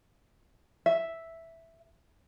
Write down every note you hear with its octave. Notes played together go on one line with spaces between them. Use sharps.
E5